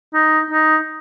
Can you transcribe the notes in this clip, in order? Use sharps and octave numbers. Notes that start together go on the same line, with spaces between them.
D#4
D#4